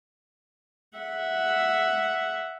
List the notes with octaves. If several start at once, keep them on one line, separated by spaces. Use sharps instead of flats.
E5 F#5